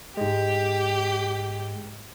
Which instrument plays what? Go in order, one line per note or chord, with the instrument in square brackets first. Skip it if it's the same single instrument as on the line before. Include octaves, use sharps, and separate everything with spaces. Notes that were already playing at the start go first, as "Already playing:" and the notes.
[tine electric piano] G#2 G#3 [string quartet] G4